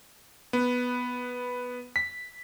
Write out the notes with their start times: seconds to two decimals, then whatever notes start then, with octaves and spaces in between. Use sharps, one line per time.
0.53 B3
1.96 B6